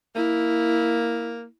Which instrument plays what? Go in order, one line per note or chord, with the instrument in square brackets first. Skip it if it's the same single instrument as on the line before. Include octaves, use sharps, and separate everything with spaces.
[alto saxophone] A#3 [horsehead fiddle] E4